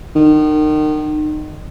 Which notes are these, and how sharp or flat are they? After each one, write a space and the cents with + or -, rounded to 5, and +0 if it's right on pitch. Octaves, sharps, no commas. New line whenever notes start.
D#3 -30